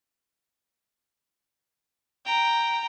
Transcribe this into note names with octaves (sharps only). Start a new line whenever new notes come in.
G5 A#5